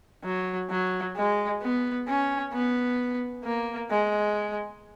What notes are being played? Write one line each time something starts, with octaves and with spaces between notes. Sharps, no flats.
F#3
F#3
G#3
B3
C#4
B3
A#3
G#3